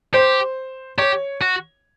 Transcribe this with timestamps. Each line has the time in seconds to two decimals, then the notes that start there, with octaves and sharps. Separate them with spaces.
0.14 G4 C5
0.98 G4 C#5
1.42 F#4